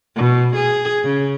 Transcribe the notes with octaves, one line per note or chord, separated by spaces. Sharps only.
B2
G#4
C#3